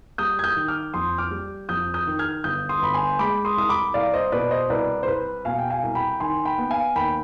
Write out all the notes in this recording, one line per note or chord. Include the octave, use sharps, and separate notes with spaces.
G3 D#6 G6
G#6
D#6 G6
D#3
D6 F6
F2 C6 D#6
D6 F6
G3
F2 D#6 G6
D#6 G6
D#3
F6 G#6
G1 D#6 G6
C6 D#6
G1 B5
G#5 C6
G#3 B5 D6
C6 D#6
C2 D#6
B5 D6
C2 D5 F5
C5 D#5
B2 B4 D5
C5 D#5
C2 B4 D5
C5
C2 B4
B2 F5 G#5
G5
F5 G#5
C2
G5 B5
D#3 G#5 C6
G5 B5
B3
F5 G#5
D#2 G5 B5